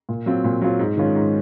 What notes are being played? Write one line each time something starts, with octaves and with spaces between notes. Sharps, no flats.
A#2
F#3 C4 F4
A#2
F#3 C4 F4
G#2
D#3 G#3 C#4 F4
G#2